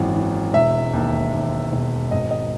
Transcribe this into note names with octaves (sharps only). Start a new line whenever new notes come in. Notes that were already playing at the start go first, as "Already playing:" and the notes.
Already playing: G#1 F#2 E3
E3
E1 E5
D#2
D#2
E1
G#1 D#5
D#5